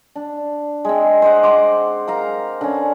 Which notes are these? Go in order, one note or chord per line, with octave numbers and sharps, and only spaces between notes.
D4
G#3 C4
C5 D#5 F#5
F#5 C6 D6
A#4 F5 A#5
D3 C#4